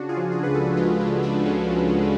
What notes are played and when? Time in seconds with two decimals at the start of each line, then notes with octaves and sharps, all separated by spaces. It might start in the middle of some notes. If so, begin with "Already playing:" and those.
Already playing: C#3 D4 F#4
0.09 F4 G#4
0.17 F3
0.32 F4 G#4
0.43 C#2 B4
0.54 F#4 A4
0.77 G#3 F4 G#4
1.00 D4 F#4
1.07 C#3
1.23 D4 F#4
1.38 F3
1.45 C#4
1.69 C#2
1.99 G#3